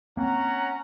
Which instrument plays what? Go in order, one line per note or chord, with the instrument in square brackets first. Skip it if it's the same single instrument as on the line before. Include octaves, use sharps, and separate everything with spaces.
[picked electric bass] A#3 C4 [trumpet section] C#4 F#5 [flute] A#5